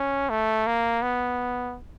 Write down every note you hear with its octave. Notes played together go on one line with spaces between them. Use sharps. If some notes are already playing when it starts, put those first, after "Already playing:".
Already playing: C#4
A3
A#3
B3